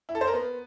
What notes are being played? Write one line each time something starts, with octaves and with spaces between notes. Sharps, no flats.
E4
A4
C5
A#4
B3